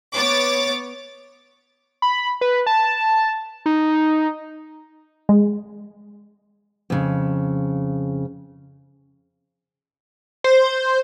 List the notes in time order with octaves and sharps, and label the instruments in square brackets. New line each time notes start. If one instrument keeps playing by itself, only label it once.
[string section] B3 C#5 D6 A6
[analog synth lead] B5
B4
A5
D#4
[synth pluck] G#3
[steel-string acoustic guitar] F2 C#3
[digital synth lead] C5